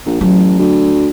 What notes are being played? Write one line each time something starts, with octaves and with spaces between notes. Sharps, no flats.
A#1
A1 F#3
D2